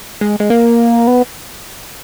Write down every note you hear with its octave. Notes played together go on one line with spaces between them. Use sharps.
G#3
G#3
A#3
B3